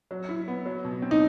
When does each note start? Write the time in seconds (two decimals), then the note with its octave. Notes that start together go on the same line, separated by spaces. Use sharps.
0.11 F#3
0.29 E4
0.48 B3
0.66 F#3
0.85 B2
1.02 C4
1.11 D#4